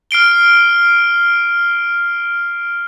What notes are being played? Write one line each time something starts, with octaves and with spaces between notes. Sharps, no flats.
F6 C7 D7 G7